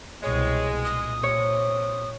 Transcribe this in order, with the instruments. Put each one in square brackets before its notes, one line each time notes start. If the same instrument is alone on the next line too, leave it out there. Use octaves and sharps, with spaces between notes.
[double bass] C2 B2 [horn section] G#3 [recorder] C#5
[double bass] A#2 [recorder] D#6
[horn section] C3 [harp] C#5